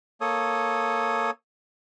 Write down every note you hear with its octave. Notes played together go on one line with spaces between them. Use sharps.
A#3 A4 C#5 D#6